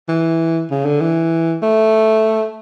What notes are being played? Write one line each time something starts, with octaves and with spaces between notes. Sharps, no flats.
E3
C#3
D3
E3
A3